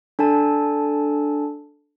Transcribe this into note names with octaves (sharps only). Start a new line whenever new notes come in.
D4 A4 G#5 A5